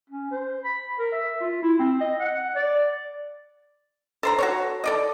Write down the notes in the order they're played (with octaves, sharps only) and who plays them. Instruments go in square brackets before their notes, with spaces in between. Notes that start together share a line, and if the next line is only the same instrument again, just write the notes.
[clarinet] C#4
C5
B5
A#4
E5
F4
E4
C4
D#5
F#5
D5
[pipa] A4 C5 A#5
F#4 A4 C#5
A4 D5 D#5